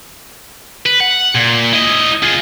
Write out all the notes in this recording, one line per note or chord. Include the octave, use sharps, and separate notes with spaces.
B4
F#5
A#2
E4 D#5
F4 G#4